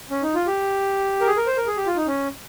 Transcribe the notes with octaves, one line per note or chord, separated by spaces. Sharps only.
C#4
D#4
F4
G4
A#4
G#4
A#4
C5
A#4
G#4
G4
F4
D#4
C#4